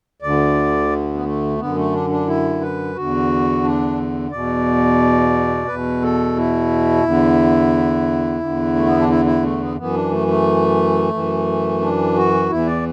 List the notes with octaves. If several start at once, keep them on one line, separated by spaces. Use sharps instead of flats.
D2 D3 D5
B3
A3
F#2 D3 B3
A3
D4
D4
E4
B4
E2 D3 F#4
D4
E2 B2 D5
E2 B2 B4
A4
E4
E2 D3
E2 D3
A3
B3
D4
E4
E4
A3
B3
F#2 E3 B3
D4
A3
A3
F#2 E3
D4
F#4
E2 E3 E4
D5